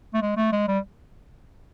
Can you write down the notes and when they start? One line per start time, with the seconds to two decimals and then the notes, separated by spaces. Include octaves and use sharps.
0.14 A3
0.22 G#3
0.37 A3
0.52 G#3
0.68 G3